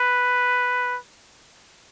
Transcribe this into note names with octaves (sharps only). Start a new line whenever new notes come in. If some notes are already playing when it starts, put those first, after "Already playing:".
Already playing: B4